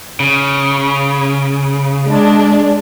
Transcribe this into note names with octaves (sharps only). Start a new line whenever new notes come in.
C#3
G#3 D4